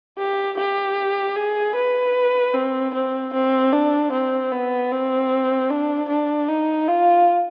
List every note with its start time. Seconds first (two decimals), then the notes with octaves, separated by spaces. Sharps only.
0.18 G4
0.58 G4
1.36 G#4
1.76 B4
2.54 C4
2.95 C4
3.34 C4
3.73 D4
4.12 C4
4.52 B3
4.91 C4
5.70 D4
6.09 D4
6.48 D#4
6.88 F4